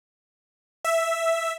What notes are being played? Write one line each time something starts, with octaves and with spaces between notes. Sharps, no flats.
E5